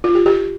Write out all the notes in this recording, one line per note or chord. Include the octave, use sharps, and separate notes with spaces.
F4
G4
G4